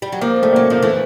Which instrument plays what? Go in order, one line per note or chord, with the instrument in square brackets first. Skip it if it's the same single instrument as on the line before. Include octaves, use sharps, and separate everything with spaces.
[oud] G3
F#3
[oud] F3 [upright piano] A#3
[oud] G3 [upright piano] A3
[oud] F#3 [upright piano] A#3
[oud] F3 [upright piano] A#3
[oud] E3 [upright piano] A3